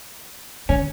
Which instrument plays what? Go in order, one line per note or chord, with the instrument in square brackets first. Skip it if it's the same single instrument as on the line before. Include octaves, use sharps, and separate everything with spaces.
[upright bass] D3 [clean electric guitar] C#4